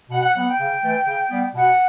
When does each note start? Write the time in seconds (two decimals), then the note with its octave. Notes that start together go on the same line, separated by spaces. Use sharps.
0.10 B2 F#5
0.22 F#5
0.34 F#3 B3 F#5
0.47 G5
0.59 C#3
0.82 E3 A3
1.07 C#3
1.30 G3 B3
1.54 B2 F#5